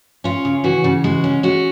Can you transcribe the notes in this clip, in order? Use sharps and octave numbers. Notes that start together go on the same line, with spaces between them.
C#4 F4
C#3
E3 F#4
C#3
G#3 F#4
C#4
C#4 F#4